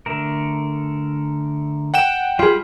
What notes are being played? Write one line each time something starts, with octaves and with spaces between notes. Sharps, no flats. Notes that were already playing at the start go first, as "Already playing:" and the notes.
D3 A3 A#4
F#5 G5 E7
G3 F4 G4 G#4 B5